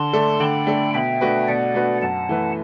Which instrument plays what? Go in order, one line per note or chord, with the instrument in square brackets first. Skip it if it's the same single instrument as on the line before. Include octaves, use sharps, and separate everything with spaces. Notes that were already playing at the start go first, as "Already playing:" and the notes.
Already playing: [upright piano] D3 [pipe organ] A5 C6
[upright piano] A3 D4 A4
[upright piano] D3 [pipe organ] G5 B5
[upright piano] A3 D4 A4
[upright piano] B2 [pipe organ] E5 G5
[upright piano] A3 D4 F#4 B4
[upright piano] B2 [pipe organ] D5 F#5
[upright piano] A3 D4 F#4 B4
[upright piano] F#2 [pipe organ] F#5 A5
[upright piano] E3 A3 E4 B4